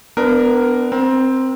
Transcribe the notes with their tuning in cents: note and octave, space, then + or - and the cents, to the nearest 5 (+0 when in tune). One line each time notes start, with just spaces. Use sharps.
B3 +25 D4 +0 A#4 +0
C4 +0 A#4 +35